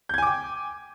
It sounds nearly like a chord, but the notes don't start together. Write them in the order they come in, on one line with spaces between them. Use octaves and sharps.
G6 G#6 G#5 D6 G5